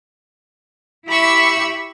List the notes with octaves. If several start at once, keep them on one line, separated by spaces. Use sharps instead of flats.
E4 G4 E5 B5 C#6 E6